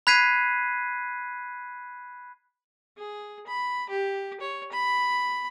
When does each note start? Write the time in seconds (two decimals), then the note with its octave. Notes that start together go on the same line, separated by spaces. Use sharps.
0.07 B5 F#6 G#6 B6 C7 D#7
2.97 G#4
3.47 B5
3.90 G4
4.41 C#5
4.72 B5